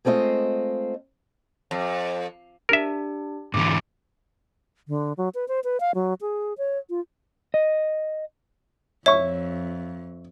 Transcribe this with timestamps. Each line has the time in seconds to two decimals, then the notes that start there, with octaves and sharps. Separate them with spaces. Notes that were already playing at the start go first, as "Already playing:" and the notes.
0.05 G#3 A3 C4 F4 D#5
1.71 F2
2.69 D4 G4 A#4 E5
3.54 G#2 D3 E3 D6
4.88 D3
5.17 F#3
5.35 B4
5.48 C5
5.64 B4
5.80 F5
5.95 F#3
6.21 G#4
6.58 C#5
6.90 F4
7.54 D#5
9.06 F2 C#5 E5 C#6